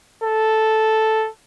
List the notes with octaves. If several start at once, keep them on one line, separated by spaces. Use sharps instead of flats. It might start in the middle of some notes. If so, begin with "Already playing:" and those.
A4